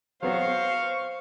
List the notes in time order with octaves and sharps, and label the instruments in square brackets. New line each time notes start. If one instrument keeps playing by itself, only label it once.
[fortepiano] F#3 B3 F#4 [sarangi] C5 [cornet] F5 [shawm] C#6